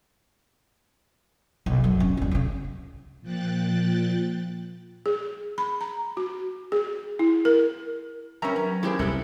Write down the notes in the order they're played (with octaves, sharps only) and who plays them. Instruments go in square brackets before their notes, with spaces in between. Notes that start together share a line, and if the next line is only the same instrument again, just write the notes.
[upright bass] B1
F#2
C#4
G1 F2
A#2 C#3
[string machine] A#2 F3 G5 F#6 A6
[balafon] G#4
B5
A#5
F#4
G#4
E4
A#4
[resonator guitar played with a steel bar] G3 C#4 [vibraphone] A#4 B4 [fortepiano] E5 A#5 C#6
[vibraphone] F#3 [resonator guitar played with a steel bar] C#4
[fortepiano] G#3 A#3 G#4 [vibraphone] C#4 [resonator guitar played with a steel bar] E4 G4 C5
[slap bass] C2 G2 [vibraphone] C4 [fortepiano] E4 [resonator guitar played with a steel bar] A4 B4